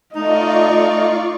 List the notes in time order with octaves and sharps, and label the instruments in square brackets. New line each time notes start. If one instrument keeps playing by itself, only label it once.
[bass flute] A3 [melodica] D#4 [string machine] F4 D5 C#6 [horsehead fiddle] D#5